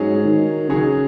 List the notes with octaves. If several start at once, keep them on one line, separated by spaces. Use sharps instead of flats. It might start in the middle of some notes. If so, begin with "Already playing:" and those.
Already playing: G#2 F#3 C#4 G#4
D#3
C#3 F#3 C#4 G#4